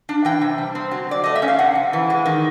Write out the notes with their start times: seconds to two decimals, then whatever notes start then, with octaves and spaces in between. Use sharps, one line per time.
0.09 D4
0.25 E3 G5
0.42 C3
0.58 G3
0.75 C4
0.91 F#3
1.09 D3 D5
1.24 A3 D#5
1.35 E5
1.42 C#4
1.48 F5
1.59 C3 F#5
1.75 F2
1.93 E3
2.10 G#3
2.26 D#3